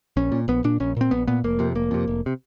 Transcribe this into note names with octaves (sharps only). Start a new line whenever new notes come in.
A#1 C#4
A#2
A#1 B3
A#2 D4
A#1 C#4
A#2 C4
A#1 B3
A#2 B3
F1 A#3
F2 C3
F1 A#3
F2 C3
F1
C3